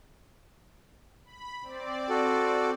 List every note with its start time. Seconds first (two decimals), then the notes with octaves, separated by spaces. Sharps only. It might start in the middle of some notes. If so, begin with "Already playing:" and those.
1.25 B5
1.62 C4 D5
2.09 F#4 A4